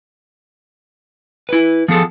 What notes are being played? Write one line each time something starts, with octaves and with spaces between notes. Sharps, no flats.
E4 B4
F3 B3 G#4 A4